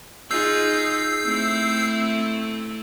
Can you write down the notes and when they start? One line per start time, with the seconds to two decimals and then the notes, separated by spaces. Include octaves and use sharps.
0.31 D#4 F4 G#4 E6 G6 C7
1.24 A3 C4 E4